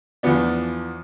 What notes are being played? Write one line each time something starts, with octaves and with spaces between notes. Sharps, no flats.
E2 E3 F3 B3 D4